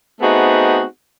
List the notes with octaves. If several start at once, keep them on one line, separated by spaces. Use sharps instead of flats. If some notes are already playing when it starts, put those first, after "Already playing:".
A3 B3 C4 D#4 F#4 G#4